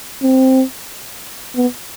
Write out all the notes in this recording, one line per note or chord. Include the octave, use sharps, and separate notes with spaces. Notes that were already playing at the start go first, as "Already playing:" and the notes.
C4
B3